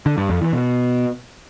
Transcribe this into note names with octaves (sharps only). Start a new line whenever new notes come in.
D3
G2
F2
E3
B2